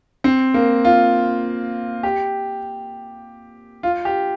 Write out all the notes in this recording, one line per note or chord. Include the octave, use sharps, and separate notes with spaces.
C4
A#3
F4
G4
F4
G4